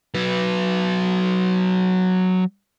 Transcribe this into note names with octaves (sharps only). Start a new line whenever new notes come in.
F#3 B4